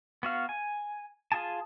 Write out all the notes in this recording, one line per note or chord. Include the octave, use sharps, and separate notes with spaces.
B3 F#4 F5
G#5
F4 G#4 G#5 A5